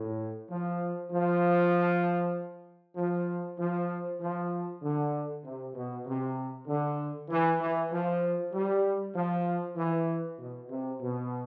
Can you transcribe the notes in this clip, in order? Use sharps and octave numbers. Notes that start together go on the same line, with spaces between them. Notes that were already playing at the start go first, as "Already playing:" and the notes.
Already playing: A2
F3
F3
F3
F3
F3
D3
C3
B2
C3
D3
E3
E3
F3
G3
F3
E3
B2
C3
B2